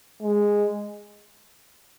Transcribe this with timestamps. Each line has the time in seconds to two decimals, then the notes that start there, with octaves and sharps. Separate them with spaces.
0.23 G#3